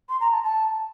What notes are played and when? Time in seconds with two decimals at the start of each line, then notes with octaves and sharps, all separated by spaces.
0.09 C6
0.20 A#5
0.32 A5
0.43 A5